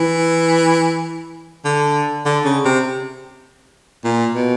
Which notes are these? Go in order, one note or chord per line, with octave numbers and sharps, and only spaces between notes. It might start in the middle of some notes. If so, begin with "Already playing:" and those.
Already playing: E3
D3
D3
C#3
C3
A#2
B2